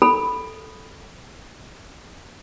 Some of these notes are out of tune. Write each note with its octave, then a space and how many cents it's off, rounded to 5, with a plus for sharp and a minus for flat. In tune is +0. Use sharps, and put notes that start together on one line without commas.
A4 +0 B5 +0